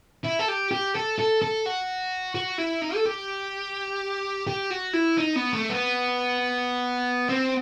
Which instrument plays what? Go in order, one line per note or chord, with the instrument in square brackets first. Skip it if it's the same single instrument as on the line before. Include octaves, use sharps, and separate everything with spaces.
[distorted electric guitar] E4
A4
G4
G4
A4
A4
A4
F#4
F#4
E4
D#4
A4
G4
G4
F#4
E4
D#4
B3
A3
B3
C4